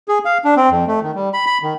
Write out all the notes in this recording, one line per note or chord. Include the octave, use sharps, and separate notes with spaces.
G#4
F5
D4
C4
F2
A3
D#3
G3
B5
B5
D#3